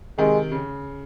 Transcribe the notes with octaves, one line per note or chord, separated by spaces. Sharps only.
C3 D#3 G#3
C#3